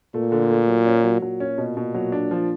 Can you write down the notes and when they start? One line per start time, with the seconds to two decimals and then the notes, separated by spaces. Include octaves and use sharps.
0.14 A#2 A3
0.32 D3
0.49 A3
0.68 F#3
0.86 C#4
1.04 F#3
1.22 A#2 F#3
1.40 C#4
1.58 B2
1.77 B2
1.94 F#3
2.12 D4
2.31 F3